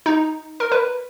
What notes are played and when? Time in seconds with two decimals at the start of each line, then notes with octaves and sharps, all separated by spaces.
0.06 D#4
0.60 A#4
0.72 B4